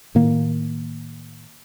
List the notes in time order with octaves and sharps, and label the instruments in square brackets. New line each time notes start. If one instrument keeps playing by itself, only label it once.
[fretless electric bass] A2 D#3 A#3